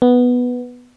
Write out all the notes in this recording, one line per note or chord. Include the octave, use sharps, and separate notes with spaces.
B3